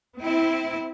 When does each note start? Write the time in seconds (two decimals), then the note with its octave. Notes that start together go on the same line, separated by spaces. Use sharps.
0.20 C4 E4